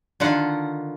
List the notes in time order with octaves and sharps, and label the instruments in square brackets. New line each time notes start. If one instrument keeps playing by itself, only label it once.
[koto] D3 D#3 F4 F#5